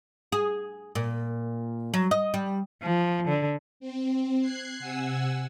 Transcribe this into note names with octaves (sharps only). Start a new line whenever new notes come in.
G#4
A#2
F#3
D#5
G3
F3
D3
C4
F#6 G#6 C7
C3 F#5 G#5 E6